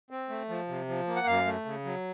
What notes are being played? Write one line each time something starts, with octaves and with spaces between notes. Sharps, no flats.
C4
A3
F3
C3
F3
A#3
F#5
F#2 F5
A3
C#3
F#3